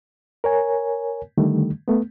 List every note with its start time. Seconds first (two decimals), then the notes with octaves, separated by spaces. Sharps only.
0.44 A#4 C#5 G#5
1.38 D3 D#3 G3 A3
1.88 A3 B3